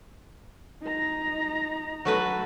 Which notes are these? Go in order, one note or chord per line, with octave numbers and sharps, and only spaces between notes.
D#4 A#5
F#3 A3 B4